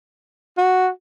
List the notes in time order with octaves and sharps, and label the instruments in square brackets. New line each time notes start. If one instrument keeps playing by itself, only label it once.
[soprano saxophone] F#4